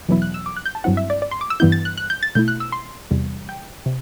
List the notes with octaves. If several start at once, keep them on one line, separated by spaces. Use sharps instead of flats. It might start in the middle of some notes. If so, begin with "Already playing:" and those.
E2 B2 F#3 B3 E4
F#6
E6
D6
F#6
G6
A5
G2 F#3 C4 E4 F#5
E5
D5
D5
C6
D6
E6
G2 E3 B3 E4 G6
A6
F#6
F#6
G6
A6
B2 A3 E4 G6
F#6
E6
C6
E2 C3 G3
G5
C3